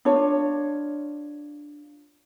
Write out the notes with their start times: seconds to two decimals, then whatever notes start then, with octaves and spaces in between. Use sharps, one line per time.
0.05 D4 F4 C#5